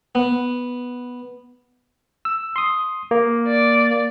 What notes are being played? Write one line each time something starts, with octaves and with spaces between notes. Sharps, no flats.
B3
E6
C6 D#6
A#3
D5